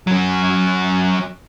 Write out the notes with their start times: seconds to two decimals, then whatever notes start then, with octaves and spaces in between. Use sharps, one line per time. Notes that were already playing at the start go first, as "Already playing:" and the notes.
0.07 F#3 C#4